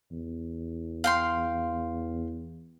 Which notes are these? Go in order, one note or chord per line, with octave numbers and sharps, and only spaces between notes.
E2
F5 G5 C6